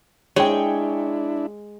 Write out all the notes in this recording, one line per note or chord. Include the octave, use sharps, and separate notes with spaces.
G#3 D4 E4 C#5 G5